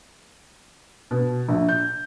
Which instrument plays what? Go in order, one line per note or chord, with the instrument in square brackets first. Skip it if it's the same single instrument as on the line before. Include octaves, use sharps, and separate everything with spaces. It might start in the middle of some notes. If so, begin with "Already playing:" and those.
[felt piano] B2
A#1
G6